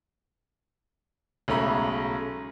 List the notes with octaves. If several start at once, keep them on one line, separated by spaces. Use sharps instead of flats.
B1 C#3 G#3 A3 A#5 B5